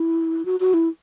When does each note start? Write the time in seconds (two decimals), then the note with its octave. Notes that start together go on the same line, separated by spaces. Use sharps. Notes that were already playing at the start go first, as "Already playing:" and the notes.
Already playing: E4
0.45 F#4
0.60 F#4
0.74 E4